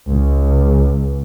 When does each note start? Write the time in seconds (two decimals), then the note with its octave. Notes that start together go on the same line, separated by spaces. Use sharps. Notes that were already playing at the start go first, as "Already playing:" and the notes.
0.11 C#2